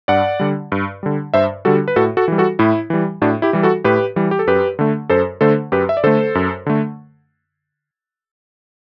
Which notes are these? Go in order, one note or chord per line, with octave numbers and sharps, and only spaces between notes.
G2 D5 F#5
D3 G3
G2
D3 G3
G2 C5 E5
D3 G3 F#4 A4
B4
A2 F#4 A4
F#4 A4
E3 G3
F#4 A4
A2 E4
E3 G3
A2 D4 F#4
E4 G4
E3 G3
F#4 A4
A2 G4 B4
E3 G3
G4
A4
F#2 G4 B4
D3 A3
F#2 A4 C5
D3 A3 A4 C5
F#2 G4 B4
E5
D5
D3 A3 A4 C5
F#2
D3 A3